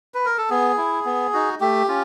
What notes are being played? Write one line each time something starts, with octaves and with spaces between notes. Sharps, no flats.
B4
A#4
A4
B3 G#4
E4
B3
D#4 F#4
A3 G4
C#4 F4